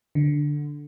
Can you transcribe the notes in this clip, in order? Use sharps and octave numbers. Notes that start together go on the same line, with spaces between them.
D3